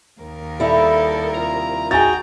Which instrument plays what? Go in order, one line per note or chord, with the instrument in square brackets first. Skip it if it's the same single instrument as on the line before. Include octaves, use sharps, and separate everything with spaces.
[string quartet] D#2 A#4
[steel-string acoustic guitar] G3 E4 [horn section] A4
[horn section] C3 F4 A#5
[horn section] D#4 G5 A#5 [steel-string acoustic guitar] F#4 G#4 [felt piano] G#5 A6